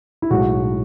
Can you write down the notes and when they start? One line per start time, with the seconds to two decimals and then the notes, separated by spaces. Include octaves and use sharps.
0.22 E4
0.31 B1 A2 G#3 F#4